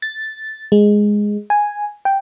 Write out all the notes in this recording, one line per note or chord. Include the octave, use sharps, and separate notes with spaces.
A6
G#3
G#5
G5